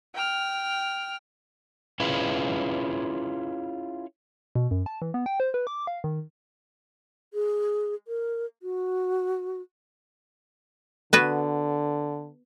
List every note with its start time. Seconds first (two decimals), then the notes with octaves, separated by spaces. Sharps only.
0.15 G5 F6
2.00 C#4 E4 F4 G#4 B4
4.55 B2
4.71 F#2
4.86 A5
5.02 E3
5.14 B3
5.26 G5
5.40 C5
5.54 B4
5.67 D6
5.87 F5
6.04 D#3
7.34 G#4
8.08 A#4
8.63 F#4
11.13 D3 B3 F#4 B4